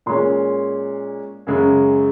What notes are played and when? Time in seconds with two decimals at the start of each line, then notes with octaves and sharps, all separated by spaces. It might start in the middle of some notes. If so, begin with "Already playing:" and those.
0.06 A#2 G#3 C#4 C6
1.47 F#2 C#3 G#3